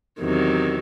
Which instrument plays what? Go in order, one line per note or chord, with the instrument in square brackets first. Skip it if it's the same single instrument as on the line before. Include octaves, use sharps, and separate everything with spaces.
[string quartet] E2 C3 D#3 F#3